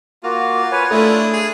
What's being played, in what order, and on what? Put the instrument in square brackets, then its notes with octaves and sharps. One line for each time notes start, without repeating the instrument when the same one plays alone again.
[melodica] A#3 F#4 [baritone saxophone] F4
[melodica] B4 C#5 G#5
[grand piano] A3 [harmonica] D4 E4 [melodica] D#6
[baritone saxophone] G#4